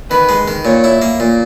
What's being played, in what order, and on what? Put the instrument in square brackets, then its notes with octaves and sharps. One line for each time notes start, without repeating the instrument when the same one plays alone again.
[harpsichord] D#3 [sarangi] B4
[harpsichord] G#3
D#3
[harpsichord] A#2 [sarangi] C#5
[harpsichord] E4
A#3
A#2